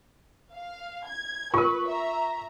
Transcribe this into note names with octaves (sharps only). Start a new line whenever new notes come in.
F5
G#6
F4 A#4 B4 C#6
E5 A#5